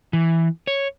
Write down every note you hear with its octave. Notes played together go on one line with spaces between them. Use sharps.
E3
C#5